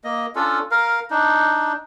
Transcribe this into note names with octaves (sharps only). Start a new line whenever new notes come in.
A#3 D#5
C#4 D4 F4 A4
A#4 F5
D4 D#4